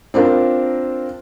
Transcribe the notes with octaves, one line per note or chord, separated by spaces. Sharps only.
C4 D4 F4 A#4